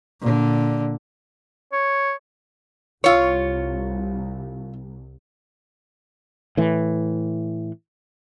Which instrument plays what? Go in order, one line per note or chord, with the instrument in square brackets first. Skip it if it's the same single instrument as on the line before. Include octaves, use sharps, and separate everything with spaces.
[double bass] A#2 D3
[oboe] C#5
[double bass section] C2 [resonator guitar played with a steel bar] F4 C#5
[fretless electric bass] A2 E3